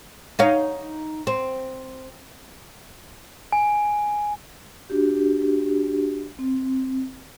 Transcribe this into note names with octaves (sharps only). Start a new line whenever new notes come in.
D#4 C#5 F5
C4
G#5
D4 F#4 G4
C4